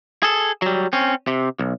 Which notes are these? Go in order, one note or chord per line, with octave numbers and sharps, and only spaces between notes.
G#4 A4
F#3 G3
C4 C#4
C3
B1